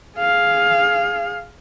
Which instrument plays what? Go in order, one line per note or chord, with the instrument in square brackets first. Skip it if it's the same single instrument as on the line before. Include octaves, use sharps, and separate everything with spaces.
[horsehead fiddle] G#4 F5